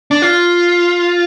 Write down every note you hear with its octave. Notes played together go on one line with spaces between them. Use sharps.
D4
F4